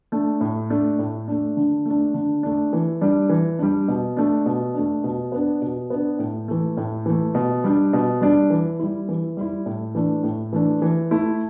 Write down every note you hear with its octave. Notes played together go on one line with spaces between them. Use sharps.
A3 D4
A2
A3 D4
A2
A3 D4
D3
A3 D4
D3
A3 D4
E3
G3 D4
E3
G3 D4
B2
A3 D4
B2
A3 D4
B2
B3 D4
B2
B3 D4
A2
E3 A3
A2
E3 A3
B2
G3 D4
B2
G3 D4
E3
G3 E4
E3
G3 E4
A2
E3 A3 D4
A2
E3 A3 D4
E3
A3 E4